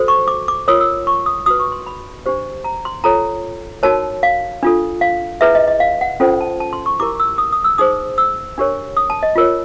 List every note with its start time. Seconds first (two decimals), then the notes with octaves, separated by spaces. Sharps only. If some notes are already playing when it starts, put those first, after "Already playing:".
Already playing: F#4 A4 C5
0.08 C#6
0.28 D6
0.48 D6
0.68 F4 A#4 C#5 D#6
0.80 E6
1.07 C#6
1.26 D#6
1.46 F#4 B4 D#6
1.59 C#6
1.72 C6
1.87 B5
2.26 D4 G4 C5
2.64 A#5
2.85 C6
3.04 F4 A4 C#5 A#5
3.83 D#4 F#4 A#4 C#5 A5
4.23 F5
4.63 D4 F4 A4
5.01 F5
5.41 E4 G#4 B4 E5
5.55 D#5
5.68 D#5
5.80 F5
6.01 F#5
6.20 C#4 F4 A4 C5 G5
6.41 A5
6.60 A5
6.73 C6
6.86 C#6
7.00 E4 G4 A#4 D6
7.20 E6
7.38 D#6
7.52 D#6
7.64 E6
7.78 D#4 G#4 C5 D#6
8.18 E6
8.58 D4 G4 A#4 C#5
8.97 D#6
9.10 A5
9.23 D#5
9.36 F4 A#4 C#5